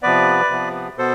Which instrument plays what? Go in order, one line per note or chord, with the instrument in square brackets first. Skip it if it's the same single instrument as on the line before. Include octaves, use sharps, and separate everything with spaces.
[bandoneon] C3 F3 B3 B4 D5
C3 F3 B3
B2 B3 A4 C5